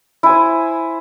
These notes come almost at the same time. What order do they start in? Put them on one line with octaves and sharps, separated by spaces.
E4 G#5 C5